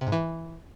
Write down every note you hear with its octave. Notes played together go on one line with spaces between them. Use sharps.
C3
G#2
E3